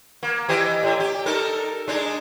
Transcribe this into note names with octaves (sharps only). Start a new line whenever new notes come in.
A#3
E3 G4 D#5
A2
G4
D#4 A4 A#4
G#3 D4 D#4